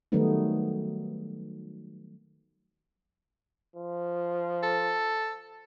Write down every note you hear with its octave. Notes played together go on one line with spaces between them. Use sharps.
D#3 F#3 G3 A3 B3 D#4
F3
A4